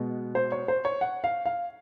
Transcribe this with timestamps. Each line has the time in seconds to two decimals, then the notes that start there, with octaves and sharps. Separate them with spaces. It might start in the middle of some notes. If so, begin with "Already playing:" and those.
Already playing: B2 G#3 B3
0.35 C5
0.52 C#5
0.68 C5
0.85 C#5
1.01 F#5
1.24 F5
1.46 F5